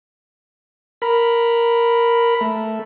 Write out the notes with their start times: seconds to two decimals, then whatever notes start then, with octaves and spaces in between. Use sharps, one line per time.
1.02 A#4 B5
2.41 A3